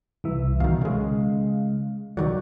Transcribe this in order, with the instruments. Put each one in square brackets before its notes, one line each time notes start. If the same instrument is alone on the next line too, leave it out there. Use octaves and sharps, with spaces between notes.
[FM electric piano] C2 E3 E5
[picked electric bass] B2 D#3 [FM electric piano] F5
[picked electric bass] C#3 G#3
[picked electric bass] B2 D#3 F#3 [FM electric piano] D5